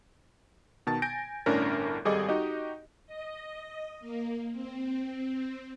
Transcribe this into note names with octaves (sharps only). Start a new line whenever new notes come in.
B2 D#3 A5 A6
G#5 G6 A#6 D7
G1 A2 C#4 D4 A#4
G#1 G3 G#4 A4 D#5 D6
D#4 F#4 G4 D#5
D#5
A#3
C4